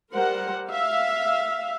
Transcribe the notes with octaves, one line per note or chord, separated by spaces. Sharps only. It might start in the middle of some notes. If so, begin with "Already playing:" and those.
G3 A#4 C5 F#5
E5 F5